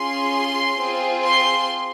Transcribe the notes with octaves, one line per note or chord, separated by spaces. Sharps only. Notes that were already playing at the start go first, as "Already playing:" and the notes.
Already playing: C#4 F4 G#4 C6
C4 F4 G#4
C6